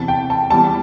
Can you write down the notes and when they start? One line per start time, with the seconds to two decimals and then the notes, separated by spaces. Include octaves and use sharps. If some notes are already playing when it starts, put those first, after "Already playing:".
Already playing: E2 C3 E3 A5
0.08 G5
0.30 A5
0.50 E2 E3 G3 A5